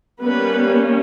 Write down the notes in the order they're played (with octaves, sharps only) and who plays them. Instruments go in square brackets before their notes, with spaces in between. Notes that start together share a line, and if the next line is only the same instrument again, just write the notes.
[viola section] G3 A#3 B3 C#4 B4